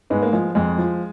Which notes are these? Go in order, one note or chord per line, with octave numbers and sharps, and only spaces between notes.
G#2 G#3 B3
A#3
F3 G#3
F2 G#3
F3